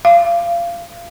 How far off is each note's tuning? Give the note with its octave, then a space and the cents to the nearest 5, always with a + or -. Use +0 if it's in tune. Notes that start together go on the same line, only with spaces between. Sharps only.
F5 -25